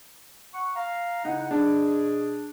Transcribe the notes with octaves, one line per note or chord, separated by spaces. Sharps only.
F#5 C#6
F5 A#5
C#3 D#4 E4 F#5
B2 D4 G#4